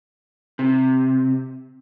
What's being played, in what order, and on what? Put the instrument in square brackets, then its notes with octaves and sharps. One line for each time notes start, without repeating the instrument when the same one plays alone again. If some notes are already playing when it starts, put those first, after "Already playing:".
[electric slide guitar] C3